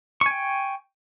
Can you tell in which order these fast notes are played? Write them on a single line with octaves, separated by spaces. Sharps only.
C#6 G#5 G5